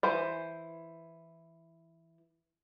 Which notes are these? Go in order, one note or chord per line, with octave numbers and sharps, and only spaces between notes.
E3 C5